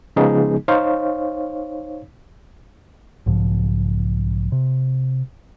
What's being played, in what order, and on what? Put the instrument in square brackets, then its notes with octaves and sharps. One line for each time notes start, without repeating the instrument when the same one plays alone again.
[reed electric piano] C#3 F3 G#3 B3 D#4 G#4
D#4 C5 C#5 F5
[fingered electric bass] B1 G#2 C#3 F3
C3